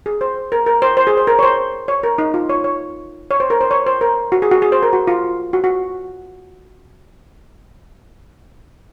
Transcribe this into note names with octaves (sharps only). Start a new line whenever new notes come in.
G#4
C5
A#4
A#4
C5
C5
G#4
C5
A#4
C#5
C5
C#5
A#4
D#4
F4
C#5
C#5
C#5
C5
A#4
C5
C#5
C5
A#4
F#4
G#4
F#4
G#4
C5
A#4
F#4
F4
F#4
F#4